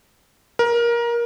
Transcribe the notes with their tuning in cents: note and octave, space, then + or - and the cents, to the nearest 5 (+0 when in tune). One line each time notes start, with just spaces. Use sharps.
A#4 +20